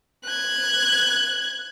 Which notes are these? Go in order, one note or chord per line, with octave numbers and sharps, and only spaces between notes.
F#6 G#6